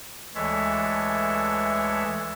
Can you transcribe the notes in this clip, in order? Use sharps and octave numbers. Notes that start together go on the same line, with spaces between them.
D2 E3 G#3 A4 C#5 E5